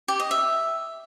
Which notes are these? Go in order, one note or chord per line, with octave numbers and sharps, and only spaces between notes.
G4
D#5
E5